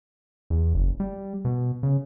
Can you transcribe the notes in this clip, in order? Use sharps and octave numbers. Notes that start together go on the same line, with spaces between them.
E2
F#1
G3
B2
C#3